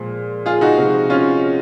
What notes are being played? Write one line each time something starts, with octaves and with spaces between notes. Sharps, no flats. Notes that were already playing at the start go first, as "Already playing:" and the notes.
Already playing: A#2 F3 G#3
F4 G#4
D#4 F#4
C3 F3 G#3
C#4 F4